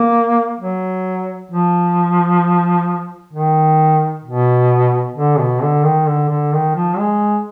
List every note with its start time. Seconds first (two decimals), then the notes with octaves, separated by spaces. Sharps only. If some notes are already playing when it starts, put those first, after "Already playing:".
Already playing: A#3
0.60 F#3
1.52 F3
3.33 D#3
4.25 B2
5.16 D3
5.39 B2
5.62 D3
5.84 D#3
6.08 D3
6.29 D3
6.53 D#3
6.75 F3
6.98 G#3